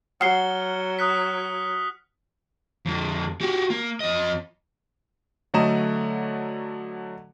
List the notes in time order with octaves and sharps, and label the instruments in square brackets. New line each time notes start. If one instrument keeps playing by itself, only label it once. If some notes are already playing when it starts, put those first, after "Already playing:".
[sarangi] F#3 [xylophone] F#5 C7 [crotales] F6 C#7 G7
[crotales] D#6 F#6 B6
[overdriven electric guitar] F2 D3
F#4 G4
A#3
F2 D#5
[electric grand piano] D3 F#3 A3 D#5 A#5 E7